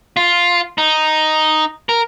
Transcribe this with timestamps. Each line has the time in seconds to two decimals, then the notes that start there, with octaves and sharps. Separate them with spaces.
0.17 F4
0.78 D#4
1.89 A#4